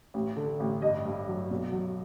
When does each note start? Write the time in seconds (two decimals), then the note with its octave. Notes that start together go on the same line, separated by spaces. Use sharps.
0.14 A1
0.37 D3
0.60 A1
0.82 G2 D#5
1.05 G2
1.28 F#3
1.51 B1
1.72 F#3